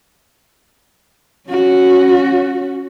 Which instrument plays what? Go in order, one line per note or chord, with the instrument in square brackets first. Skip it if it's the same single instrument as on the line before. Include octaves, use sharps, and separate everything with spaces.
[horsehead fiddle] C#4 F#4